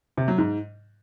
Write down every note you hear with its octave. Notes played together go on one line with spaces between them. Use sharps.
C3
F#3
G#2